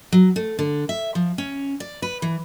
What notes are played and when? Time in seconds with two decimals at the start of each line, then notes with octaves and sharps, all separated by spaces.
0.12 F#3
0.36 A3
0.59 D3
0.89 E5
1.15 F3
1.38 C#4
1.80 D5
2.02 B4
2.22 E3